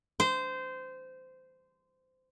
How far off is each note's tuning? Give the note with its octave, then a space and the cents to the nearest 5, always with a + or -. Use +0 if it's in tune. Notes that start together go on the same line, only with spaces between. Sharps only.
C5 -20